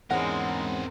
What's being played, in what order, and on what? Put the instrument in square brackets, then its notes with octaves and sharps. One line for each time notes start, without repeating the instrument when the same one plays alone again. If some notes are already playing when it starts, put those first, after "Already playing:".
[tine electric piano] E2 G#2 C#4 [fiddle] G#3 [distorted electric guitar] C4 A#4 [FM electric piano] F#5